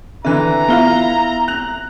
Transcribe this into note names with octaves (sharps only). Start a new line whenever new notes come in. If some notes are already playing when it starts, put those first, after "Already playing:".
D3 E3 E5 A#5 F#6
B3 E4 F4 F5 G7
F#6 F7